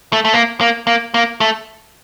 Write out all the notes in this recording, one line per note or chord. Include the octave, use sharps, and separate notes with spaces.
A3
A3
A#3
A#3
A#3
A#3
A3